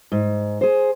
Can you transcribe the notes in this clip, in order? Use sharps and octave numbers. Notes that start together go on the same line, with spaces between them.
G#2
G#4 C5